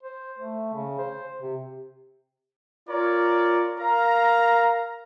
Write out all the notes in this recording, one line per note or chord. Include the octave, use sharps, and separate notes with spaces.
C5
A3
C#3
C5
C3
F4 A#4 C#5 D5
A#4 F5 A#5